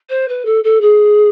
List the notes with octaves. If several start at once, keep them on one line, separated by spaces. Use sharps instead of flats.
C5
B4
A4
A4
G#4